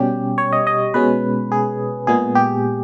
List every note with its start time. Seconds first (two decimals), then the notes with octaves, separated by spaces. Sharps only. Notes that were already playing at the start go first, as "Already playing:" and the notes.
Already playing: B2 G3 C#4 G4
0.38 C#5
0.53 D#5
0.67 D#5
0.94 B2 G#3 C#4 B4
1.52 G#4
2.07 A#2 G#3 B3 G#4
2.35 G4